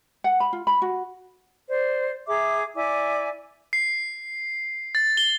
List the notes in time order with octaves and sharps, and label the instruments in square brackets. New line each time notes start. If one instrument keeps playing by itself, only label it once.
[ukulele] F#5
B5
F4
B5
F#4
[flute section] C5 D5
G#4 E5 A#5 D6
E4 D5 G#5 D6
[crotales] C7
A6
G7